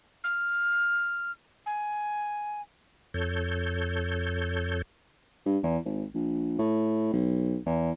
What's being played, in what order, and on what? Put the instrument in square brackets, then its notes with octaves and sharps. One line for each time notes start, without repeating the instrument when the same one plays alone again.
[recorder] F6
G#5
[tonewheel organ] F2 A4 C#5 G6
[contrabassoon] G2
E2
G#1
A#1
A2
B1
E2